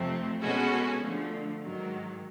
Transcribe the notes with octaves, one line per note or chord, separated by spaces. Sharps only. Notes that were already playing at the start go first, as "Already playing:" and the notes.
Already playing: F2 C3 F3 A3 C4
B2 G#3 C#4 F#4 A4
D3 F3 A3
G#2 D#3 F#3